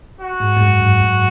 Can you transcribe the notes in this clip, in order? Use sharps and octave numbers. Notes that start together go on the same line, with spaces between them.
F#4
G#2
G#2
F#2
F#2
F#2